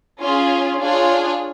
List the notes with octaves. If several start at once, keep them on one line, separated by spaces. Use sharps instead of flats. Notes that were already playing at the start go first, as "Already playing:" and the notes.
C#4 F4 G#4
D4 F4 G#4 C#5